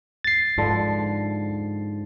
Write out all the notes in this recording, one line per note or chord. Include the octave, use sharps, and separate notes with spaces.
A6 C7
G#2 D3 F3 B4